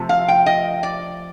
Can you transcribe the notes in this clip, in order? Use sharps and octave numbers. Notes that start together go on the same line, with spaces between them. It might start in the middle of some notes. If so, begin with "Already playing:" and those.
Already playing: C3 F3 A3
F5
G5
D#5
D5